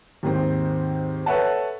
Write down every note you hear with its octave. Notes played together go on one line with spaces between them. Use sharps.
D#2 G#2 D#3 C4
A4 B4 C#5 E5 F#5 A5